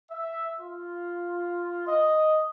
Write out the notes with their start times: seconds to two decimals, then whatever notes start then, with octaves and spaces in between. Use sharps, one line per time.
0.10 E5
0.61 F4
1.87 D#5